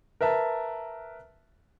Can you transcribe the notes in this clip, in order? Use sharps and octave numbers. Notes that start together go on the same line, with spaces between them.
A#4 B4 E5 A5